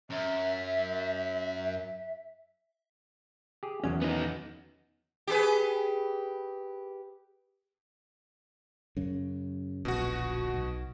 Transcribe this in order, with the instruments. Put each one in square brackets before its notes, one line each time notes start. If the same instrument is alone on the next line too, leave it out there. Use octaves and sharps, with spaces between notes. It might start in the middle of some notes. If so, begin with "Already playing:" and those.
[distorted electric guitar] F#2 [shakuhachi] E5
[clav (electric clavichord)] G4 G#4
[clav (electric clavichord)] E2 [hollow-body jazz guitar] D#3 F#3 C#4
[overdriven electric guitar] B3 D#4
[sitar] G4 G#4 B4
[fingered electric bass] F#2 C#3
[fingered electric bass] D1 A#1 [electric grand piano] B2 F#4
[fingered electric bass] B1